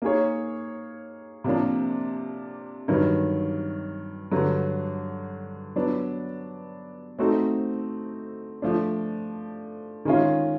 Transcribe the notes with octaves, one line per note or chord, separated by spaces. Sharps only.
A#3 D#4 G#4 C#5
C3 F3 A#3 D4
G2 D#3 F#3
G2 D3 F#3
F#3 B3 D4
A3 C4 D#4 F#4 A4
F3 A3 D4
D#3 G#3 C#4 F4